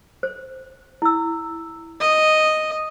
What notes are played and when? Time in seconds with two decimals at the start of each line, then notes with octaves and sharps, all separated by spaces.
0.23 C5
1.02 E4 E6
2.00 D#5